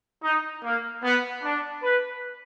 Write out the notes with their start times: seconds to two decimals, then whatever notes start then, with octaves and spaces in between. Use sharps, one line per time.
0.22 D#4
0.62 A#3
1.02 B3
1.42 D4
1.81 B4